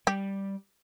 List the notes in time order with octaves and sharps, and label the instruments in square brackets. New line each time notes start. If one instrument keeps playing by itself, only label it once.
[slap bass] G3 [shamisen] G4